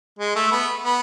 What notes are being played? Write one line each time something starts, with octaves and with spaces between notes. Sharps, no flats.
G#3
A3
B3
B3